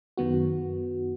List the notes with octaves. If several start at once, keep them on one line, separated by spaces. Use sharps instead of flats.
F#2 D#3 B3 F#4